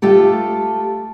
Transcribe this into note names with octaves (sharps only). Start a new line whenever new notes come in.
A3 F4 G4 A4